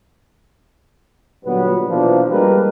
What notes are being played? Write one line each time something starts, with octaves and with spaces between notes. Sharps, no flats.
A#2 D3 F#3 G3 B3
B2 E3 F3 A#3 D4
G3 G#3 A#3 G4 A#4 B4